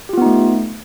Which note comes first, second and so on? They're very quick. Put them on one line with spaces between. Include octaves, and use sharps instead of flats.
G4 F4 B3 D#4 A3